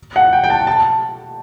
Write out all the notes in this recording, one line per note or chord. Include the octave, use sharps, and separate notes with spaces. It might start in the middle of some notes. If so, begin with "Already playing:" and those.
F#5
G5
G5
A5
A5